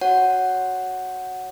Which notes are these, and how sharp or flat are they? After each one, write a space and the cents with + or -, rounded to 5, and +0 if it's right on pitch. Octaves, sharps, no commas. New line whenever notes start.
F#4 +0 C#5 +0 F#5 +0